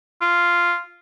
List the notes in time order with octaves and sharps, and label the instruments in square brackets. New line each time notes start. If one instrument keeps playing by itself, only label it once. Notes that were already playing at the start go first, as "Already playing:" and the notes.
[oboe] F4